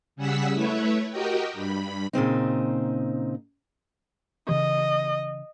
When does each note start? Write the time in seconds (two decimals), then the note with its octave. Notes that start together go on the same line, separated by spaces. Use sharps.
0.16 C#3 G3 G#4 F#5 E6 B6
0.53 A3 E4 B4 C#5 E5
1.11 F#4 G4 A#4 D#5 G5
1.53 G2 B5
2.13 A#2 C#3 C4 D#4
4.49 C#3 E3 D#5